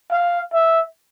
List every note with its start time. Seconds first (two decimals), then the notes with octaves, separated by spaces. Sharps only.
0.11 F5
0.53 E5